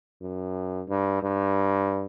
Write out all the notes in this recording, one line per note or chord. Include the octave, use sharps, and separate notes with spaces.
F#2
G2
G2